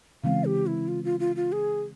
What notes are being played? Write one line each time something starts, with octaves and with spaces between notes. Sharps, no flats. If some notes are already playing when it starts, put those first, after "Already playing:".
C#3 E3 G#3 C4 F5
G4
E4
F4
F4
F4
F4
G#4